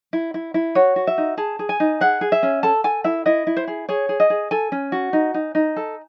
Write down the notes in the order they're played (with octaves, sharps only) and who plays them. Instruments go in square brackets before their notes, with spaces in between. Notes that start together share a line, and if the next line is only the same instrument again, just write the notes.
[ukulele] E4
E4
E4
F#4 C#5
F#4
E5
D#4
G#4 A5
G#4
G#5
D#4
G#4 F#5
G#4
E5
C#4
A4 A5
A4 G#5
E4 E5
E4 D#5
E4
C5
G#4
G#4 C#5
G#4
D#5
G#4
A4 G#5
C#4
F#4
D#4
D#4
D#4
A4